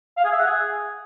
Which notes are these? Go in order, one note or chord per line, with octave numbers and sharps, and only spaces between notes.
F5
G#4
E5
F#5
G#4